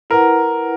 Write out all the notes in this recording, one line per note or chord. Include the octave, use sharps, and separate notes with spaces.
E4 A#4 B4 F#5